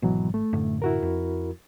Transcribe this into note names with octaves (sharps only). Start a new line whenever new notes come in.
G#1 B2 E3 F#3
A3
F#2 A2 D3
E4 F#4 A#4
F2